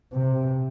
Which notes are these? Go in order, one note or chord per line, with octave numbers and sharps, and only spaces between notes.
C3